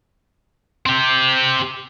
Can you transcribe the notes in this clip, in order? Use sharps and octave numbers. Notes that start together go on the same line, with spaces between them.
C4 G4